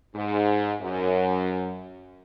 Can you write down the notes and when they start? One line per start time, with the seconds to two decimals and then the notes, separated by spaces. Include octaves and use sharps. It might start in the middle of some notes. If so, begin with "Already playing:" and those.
0.15 G#2
0.81 F#2